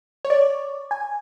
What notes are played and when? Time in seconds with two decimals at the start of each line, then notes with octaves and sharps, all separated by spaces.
0.25 C#5
0.30 D5
0.91 G#5